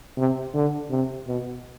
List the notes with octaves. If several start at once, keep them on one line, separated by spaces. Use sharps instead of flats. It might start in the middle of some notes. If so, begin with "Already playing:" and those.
C3
D3
C3
B2